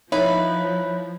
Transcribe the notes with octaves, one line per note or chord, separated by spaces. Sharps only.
F3 D#4 E4 B4 C#5 E5